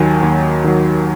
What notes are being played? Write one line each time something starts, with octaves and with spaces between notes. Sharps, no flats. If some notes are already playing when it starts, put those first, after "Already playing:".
Already playing: D#2 D#3 F#3 G#5
D#2
D#3 F#3